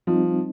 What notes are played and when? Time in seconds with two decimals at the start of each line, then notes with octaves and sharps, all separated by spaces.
0.07 F3 G3 C4 D#4